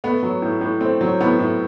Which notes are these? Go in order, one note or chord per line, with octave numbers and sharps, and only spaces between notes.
A3 B3
F#3
A2
A2
A3 C4
F#3
A2 B3
A2